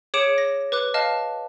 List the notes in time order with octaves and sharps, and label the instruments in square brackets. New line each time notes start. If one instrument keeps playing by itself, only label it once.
[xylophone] G#4 C#5 D6 C#7 D7 E7
A#6
B4 D6 F#6
D#5 F5 A5 F6